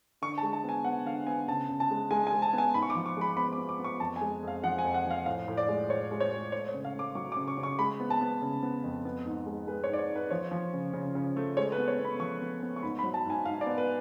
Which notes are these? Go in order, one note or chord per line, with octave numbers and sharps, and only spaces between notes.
D3 C#6
A5
G#3
A5
B3 G#5
B3 F#5
D3 F5
B3 G#5
C#3 A5
C#3
A5
G#3
G#3 G#5
G#5
G#3
A5
B3
G#5
G#2 B5
C#6
D6
F3
C#6
G#3 B5
B3 B5
D6
B3
D6
B3
C#6
F2 A5
G#5
G#3
F2
F5
F3 F#5
G#5
F2
F#5
F3
F5
A2 F5
A2
D5
G#3
A2 C#5
G#3
C#5
G#3
A3 C#5
C#5
C#3
F5
A3 D6
F#3 C#6
D6
C#3
C#6
C#3
C#6
G#3 B5
B3
A5
B3
C#3
B3
F2
B3
G#2
G#3
G#3 B4
C#5
G#2 D5
C#5
G#2
B4
F3 C#5
F3
C#3
C#3
C#3
A3
G#3 C#5
B4
B3
C#5
B3
B5
F3 C#6
B3
B3
C#6
G#2 B5
B5
F#3
A5
G#2 G#5
G#2 F5
D5
B3
B4